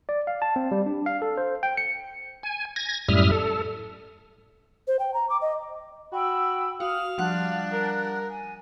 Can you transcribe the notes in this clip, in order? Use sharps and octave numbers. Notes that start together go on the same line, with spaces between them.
D5
F5
A5
C4
G3
D4
F5
A4
C5
G5
C#7
G#5
G#6 A#6
F#2 A2 G3 E5 D#6 F6
A4
C5
G5
A#5
D6
D#5
F#4 G5 B5 E6
F#4 F5 D#6 F6
F3 G3 D4 F#5 F#6
A#4
G#5